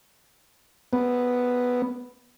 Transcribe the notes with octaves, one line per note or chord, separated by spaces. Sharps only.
B3